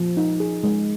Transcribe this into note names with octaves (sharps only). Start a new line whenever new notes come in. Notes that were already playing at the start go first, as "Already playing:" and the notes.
Already playing: F3
D#4
G#4
G#3